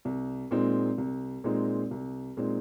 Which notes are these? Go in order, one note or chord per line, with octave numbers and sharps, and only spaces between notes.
C2
A#2 G#3 C4 D#4
C2
A#2 G#3 C4 D#4
C2
A#2 G#3 C4 D#4